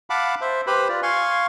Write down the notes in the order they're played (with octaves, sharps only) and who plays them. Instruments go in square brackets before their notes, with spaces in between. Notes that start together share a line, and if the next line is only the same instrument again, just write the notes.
[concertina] F5 F#5 A5 B5 D6
C5 E5
G4 B4 C5 B5
F4 D5
F5 G#5 C6 C#6